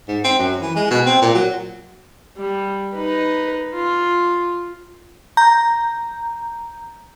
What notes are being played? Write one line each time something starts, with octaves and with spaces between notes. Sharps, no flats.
G#2
C4
F#2
E3
G#3
B2
C4
A#2
F#3
G3
D#4 B4
F4
A#5 G6